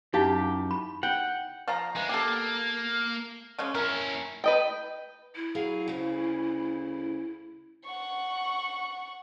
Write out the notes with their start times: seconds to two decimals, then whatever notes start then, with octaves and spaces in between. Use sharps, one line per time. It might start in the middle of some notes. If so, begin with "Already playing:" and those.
0.14 F#2 D#4 E4 G4 F5
0.71 B5
1.03 F#5 G5
1.68 F3 F5 A#5
1.96 E3 G#3
2.09 A#3 G4 A4
3.58 C#3 G#3 C#4
3.75 C#4 E4 A#4
4.44 B4 D#5 G5
5.36 E4
5.55 F#3 G#4 F5
5.88 D2 C#3
7.85 F#5 C#6